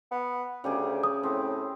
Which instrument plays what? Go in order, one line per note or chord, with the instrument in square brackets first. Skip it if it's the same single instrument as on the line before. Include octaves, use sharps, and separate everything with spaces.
[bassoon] B3
[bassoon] D2 [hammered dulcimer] C#3 G4 G#4
[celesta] D#6
[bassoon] A2 [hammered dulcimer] C4